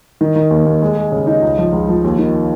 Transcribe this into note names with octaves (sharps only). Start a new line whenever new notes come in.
D#3
D#3
D#2
D#2
G#3
G#3
C#3
D#4
C#2
F3
C#2
F3
D#2
D#3